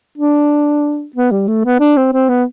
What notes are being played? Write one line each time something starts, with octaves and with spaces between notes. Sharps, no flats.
D4
B3
G3
A3
B3
D4
C4
C4
B3